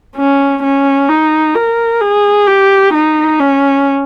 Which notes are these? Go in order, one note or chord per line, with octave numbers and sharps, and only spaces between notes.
C#4
C#4
D#4
A#4
G#4
G4
D#4
C#4